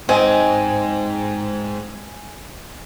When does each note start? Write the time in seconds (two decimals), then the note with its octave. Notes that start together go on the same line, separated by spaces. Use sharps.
0.09 G#2 C4 D#5 G#5